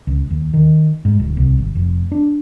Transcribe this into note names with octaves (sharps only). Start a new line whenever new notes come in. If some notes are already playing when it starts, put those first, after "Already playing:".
C#2
D#2
D#3
G#2
D1
C2
G#1
F1
D4